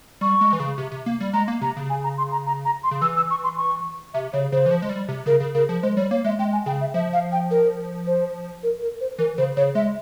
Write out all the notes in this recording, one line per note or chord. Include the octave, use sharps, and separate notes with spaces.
G3 C#6
G#3
E3
C#3
C3
C3
A#3
G3
G#3 A#5
A#3
C3 A#5
C#3
G#5
A#5
C6
A#5
A#5
A#5
C6
C#3
E3 E6
E6
C#6
C6
C#6
C3 E5
C#3 C#5
C#3 C5
E3
F3
G#3
G3
C3
C#3 A#4
C#3
C#3 A#4
F3
G#3 C5
G3 C#5
A#3 C#5
G#3 E5
G#3 G5
G#5
C#3 G5
E5
F3 E5
F5
G5
A#4
C5
A#4
A#4
C5
E3 A#4
C#3 C5
C#3 C#5
G#3 E5